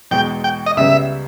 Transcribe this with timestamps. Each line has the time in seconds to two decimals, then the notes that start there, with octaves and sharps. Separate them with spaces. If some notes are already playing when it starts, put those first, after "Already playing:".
0.11 E2 B2 G#3 G5
0.44 G5
0.66 D#5
0.77 C#2 C#3 G3 B3 E5